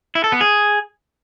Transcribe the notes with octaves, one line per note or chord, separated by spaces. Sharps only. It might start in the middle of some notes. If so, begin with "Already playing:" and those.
E4
A4
B3
G#4